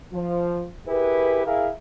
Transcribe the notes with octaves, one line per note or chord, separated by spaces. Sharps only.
F3
E4 G4 G#4 A#4 B4
E4 G#4 A#4 E5 F5